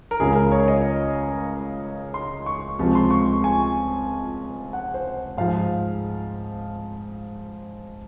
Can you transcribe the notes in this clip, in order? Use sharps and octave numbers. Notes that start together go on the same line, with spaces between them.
A#4
C#2 C#3 G#3 G#4
A#4
C#5
D#5
C6
C#6
C#2 C3 F3 G#3
C6
C#6
G#5
F#5
C5
G#2 F3 G#3 F5